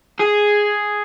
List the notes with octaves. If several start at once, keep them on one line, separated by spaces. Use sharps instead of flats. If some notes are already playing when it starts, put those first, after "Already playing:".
G#4